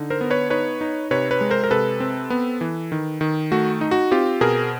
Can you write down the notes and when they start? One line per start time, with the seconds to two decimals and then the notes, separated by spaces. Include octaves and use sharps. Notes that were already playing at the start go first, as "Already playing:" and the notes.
Already playing: D3 D#4
0.10 A#4 C5
0.21 B3
0.30 B4 C#5
0.50 D#4 B4 C#5
0.81 D#4
1.11 C3 B4 C#5
1.31 B4 C#5
1.41 G#3
1.51 A#4 C5
1.64 A#4
1.71 C3 A4 B4
2.00 C4
2.30 B3
2.61 E3
2.92 D#3
3.21 D#3
3.52 A3 F#4
3.81 D#4
3.91 F#4
4.11 C4 F4 G4
4.41 B2 G#4 A#4